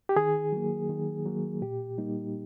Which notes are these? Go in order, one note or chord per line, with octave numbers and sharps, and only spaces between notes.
G4
D#3 G#4
F#3 A#3
D#3
F#3 A#3
A#2 G4
G3 A#3 D#4